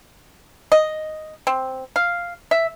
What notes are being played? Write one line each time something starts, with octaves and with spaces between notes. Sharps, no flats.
D#5
C4
F5
E5